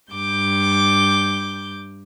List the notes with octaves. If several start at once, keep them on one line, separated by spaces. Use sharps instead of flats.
G2 D6 G6